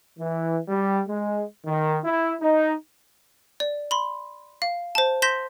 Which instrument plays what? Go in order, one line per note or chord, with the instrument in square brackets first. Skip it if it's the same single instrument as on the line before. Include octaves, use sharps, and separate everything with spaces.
[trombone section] E3
G3
G#3
D#3
E4
D#4
[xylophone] D5
B5 C6
F5
C5 A5
C6 G6 A#6 B6 E7 G7